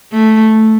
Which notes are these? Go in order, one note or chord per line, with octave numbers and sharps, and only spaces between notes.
A3